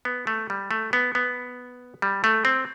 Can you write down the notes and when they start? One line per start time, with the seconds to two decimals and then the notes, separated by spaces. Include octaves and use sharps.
0.05 B3
0.27 A3
0.50 G3
0.71 A3
0.93 B3
1.15 B3
2.02 G3
2.24 A3
2.45 C4